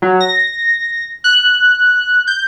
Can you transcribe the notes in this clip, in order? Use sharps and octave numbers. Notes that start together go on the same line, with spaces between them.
F#3
A#6
F#6
G6